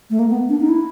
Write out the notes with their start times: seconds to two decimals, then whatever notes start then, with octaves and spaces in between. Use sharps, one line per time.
0.10 A3
0.19 A#3
0.30 B3
0.49 D4
0.60 D#4
0.69 E4